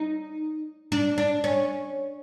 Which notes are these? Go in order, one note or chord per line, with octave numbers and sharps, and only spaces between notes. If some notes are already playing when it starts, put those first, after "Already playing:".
Already playing: D#4
D4
D4
C#4